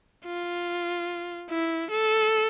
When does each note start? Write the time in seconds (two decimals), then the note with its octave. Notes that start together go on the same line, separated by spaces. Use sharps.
0.25 F4
1.50 E4
1.90 A4